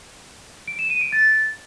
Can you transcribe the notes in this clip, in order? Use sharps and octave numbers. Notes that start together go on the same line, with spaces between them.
D7
E7
D#7
D7
A6